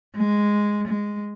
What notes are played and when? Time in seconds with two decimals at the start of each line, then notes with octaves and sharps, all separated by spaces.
0.16 G#3
0.88 G#3